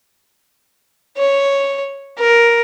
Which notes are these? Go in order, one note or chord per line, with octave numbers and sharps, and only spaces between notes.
C#5
A#4